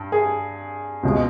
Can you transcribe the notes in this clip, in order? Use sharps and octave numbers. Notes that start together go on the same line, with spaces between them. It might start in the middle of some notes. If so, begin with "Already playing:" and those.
Already playing: G2
G#4
C#2 B2 G#3